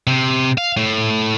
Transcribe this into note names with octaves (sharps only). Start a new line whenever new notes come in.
C3
F5
A2